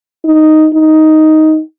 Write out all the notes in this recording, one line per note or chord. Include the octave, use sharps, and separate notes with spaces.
D#4
D#4